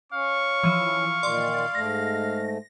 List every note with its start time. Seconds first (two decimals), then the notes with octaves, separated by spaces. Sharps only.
0.13 C#4 F5 C#6
0.63 E3 F3
1.23 A#2 D#3 D5 C6
1.75 G#2 A3 A#6